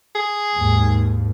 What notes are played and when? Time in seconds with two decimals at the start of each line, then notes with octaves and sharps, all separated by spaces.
0.15 G#4
0.54 D#2 G#2